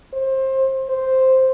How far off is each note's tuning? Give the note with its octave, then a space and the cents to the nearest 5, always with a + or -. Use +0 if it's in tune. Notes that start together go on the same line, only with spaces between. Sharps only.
C5 +25
C5 +0